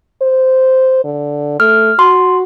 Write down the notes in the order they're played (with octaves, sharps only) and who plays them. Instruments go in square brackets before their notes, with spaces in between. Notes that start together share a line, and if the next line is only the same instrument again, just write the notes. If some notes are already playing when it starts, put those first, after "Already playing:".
[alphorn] C5
D3
[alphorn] A3 [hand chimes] F6
[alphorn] F#4 [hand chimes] C6